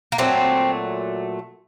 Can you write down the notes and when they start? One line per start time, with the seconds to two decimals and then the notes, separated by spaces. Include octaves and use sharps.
0.12 A#3
0.18 A#2 F#3 A3 C4